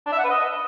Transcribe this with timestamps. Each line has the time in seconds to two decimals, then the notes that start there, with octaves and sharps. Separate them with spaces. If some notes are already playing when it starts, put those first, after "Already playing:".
0.06 D4
0.12 E5
0.18 F#5
0.24 B4
0.30 D#5